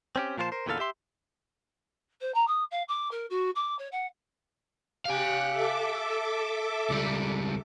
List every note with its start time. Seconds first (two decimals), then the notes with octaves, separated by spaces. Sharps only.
0.16 C4 C#4 G4
0.38 A#2 F3 F4 A#4 C5 A5
0.52 A#4 C5
0.66 E2 A#2 D3 B3 A4 F5
0.79 G4 E5 C6
2.21 C5
2.34 A#5
2.47 D#6
2.71 F5
2.88 D6
3.11 A#4
3.30 F#4
3.55 D6
3.79 C#5
3.92 F#5
5.05 G4 F5 G#5 F#6
5.50 A4 E5 D6
6.90 C#2 G3